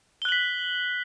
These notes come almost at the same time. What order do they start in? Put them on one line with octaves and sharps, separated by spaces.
G7 F#6 F#7 B6